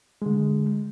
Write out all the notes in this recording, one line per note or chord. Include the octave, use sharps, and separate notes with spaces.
D3 G#3